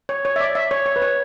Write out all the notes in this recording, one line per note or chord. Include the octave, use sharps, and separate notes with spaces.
C#5
C#5
E5
D5
E5
C#5
C#5
B4
C#5